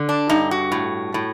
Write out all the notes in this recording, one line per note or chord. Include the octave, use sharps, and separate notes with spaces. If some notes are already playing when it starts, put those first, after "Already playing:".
Already playing: D3
D4
G2 D#4
F#4
A2
A2